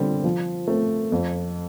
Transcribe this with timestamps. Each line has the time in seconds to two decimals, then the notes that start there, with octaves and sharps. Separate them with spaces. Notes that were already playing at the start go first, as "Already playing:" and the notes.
Already playing: D3 G3 C4
0.24 F3
0.67 A3 C4
1.12 F2